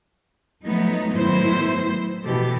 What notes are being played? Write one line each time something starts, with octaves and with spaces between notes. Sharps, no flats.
F3 F#3 A3 B3 D#4
A2 D#3 F#3 B3 E4 C5
B2 E3 G4 A4